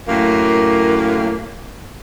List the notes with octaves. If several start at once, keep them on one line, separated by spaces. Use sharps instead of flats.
F#2 A2 A#3